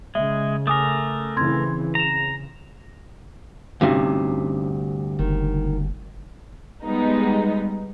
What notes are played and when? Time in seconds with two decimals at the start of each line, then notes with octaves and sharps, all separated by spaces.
0.15 C#3 G#3 E5
0.67 A3 A#4 G#5 D6 D#6
1.37 C#3 E3 C4 C6 G#6
1.95 C#3 A#5 E7 F7
3.81 D2 G2 C3 C#4 D#4 F#4
5.19 F#1 D#3
6.84 G3 G#3 B3 D#4